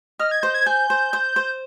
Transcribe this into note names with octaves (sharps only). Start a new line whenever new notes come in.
D#5 F6
G#6
C5 G6
G#6
G#5 G6
C5
C5
C5